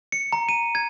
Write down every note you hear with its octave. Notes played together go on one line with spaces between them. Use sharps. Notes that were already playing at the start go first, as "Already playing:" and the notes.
C#7
A#5
D#7
G#6